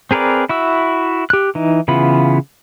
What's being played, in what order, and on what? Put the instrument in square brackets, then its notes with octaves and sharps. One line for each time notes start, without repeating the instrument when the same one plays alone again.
[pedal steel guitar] C4 G#4 A#4 B4 D5
E4 F#4 E6
G4 F#6
E3 D#4
C#3 E3 B3 F4 B5